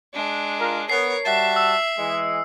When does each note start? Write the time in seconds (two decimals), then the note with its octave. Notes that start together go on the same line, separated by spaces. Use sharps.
0.13 G#3 D4
0.58 F4 A#4
0.90 B3 A#4 C#5 C7
1.25 G3 F#4 E5 A5
1.56 E6
1.97 E3 G#3